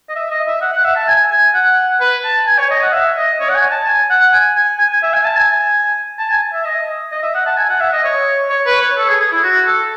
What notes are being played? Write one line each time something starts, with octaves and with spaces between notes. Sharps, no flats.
D#5
E5
D#5
E5
F#5
F#5
E5
A5
G#5
G#5
F#5
B4
A5
G#5
C#5
D#5
F#5
E5
D#5
C#5
F#5
G#5
A5
G#5
F#5
G#5
G#5
G#5
G#5
E5
G#5
A5
G#5
A5
G#5
E5
D#5
D#5
E5
F#5
A5
G#5
F#5
E5
D#5
C#5
C#5
B4
C#5
A4
G#4
G#4
E4
F#4
A4